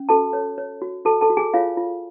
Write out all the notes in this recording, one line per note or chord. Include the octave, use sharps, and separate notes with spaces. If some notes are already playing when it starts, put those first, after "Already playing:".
Already playing: C#4
F#4 A4 A5
C#5
C#5
F#4
F#4 A4 A5
A4 A5
F#4
G#4 G#5
F4 C#5 F5
F4